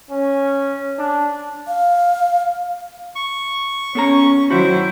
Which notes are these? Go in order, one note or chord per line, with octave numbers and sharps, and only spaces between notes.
C#4
D4
F5
C#6
B3 C#4 A4 A#5
D#3 F#3 E4 F#4 C5